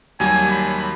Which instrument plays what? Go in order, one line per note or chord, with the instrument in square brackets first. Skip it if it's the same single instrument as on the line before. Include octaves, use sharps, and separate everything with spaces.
[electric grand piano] D#2 F#3 G3 [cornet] G#5
[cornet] B5